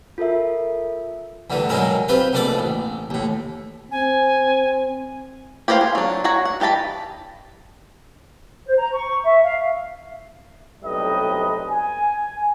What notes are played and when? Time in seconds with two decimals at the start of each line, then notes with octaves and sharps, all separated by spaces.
0.18 F4 A4 A#4 E5
1.50 E2 G2 D3 A3
1.69 B2 D#3 F#3 G#3 E4 A#4
2.08 C4 F4 G4 B4
2.33 A#1 B2 A3 D4 D5 D6
2.59 A1
3.10 D#2 A2
3.91 C4 G#5
5.68 G4 B4 C5 D#5 F5
5.81 G#4
5.95 F#3 D4
6.24 F#4 C#5 F#5 A#5
6.45 F#5
6.60 E3 G4 D#5 A5 B5
8.67 C5
8.78 A#5
8.94 C#6
9.24 E5
9.43 F5
10.83 B1 A2 C3 G3 B4 D#5
11.70 G#5